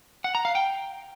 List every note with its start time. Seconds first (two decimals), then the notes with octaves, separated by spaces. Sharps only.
0.24 F#5
0.35 A#5
0.45 F5
0.55 G5